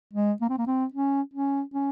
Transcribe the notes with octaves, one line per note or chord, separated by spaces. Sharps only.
G#3
A#3
C4
A#3
C4
C#4
C#4
C#4